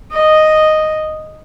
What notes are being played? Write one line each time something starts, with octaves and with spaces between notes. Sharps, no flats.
D#5